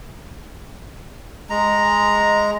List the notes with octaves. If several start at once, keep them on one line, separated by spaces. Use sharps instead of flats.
G#3 A#5